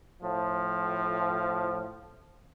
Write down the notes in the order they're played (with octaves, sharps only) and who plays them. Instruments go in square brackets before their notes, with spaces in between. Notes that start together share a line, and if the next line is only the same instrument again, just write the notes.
[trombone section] A2 F3